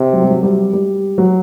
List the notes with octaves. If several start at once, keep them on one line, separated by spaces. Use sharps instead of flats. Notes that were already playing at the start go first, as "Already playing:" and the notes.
Already playing: C3
F#3
G3
F#3
G3
G3
F#3